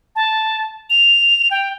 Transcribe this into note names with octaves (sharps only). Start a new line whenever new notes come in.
A5
F7
G5